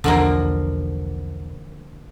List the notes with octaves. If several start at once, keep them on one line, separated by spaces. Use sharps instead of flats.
B1 E2 D3 F3 A#3